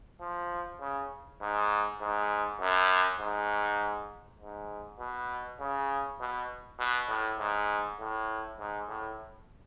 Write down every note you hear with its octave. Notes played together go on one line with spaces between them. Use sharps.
F3
C#3
G#2
G#2
F#2
G#2
G#2
B2
C#3
B2
B2
A2
G#2
A2
G#2
A2